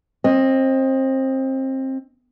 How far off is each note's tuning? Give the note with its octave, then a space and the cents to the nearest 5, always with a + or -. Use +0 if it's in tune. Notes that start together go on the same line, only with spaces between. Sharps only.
C4 +25 D#5 +0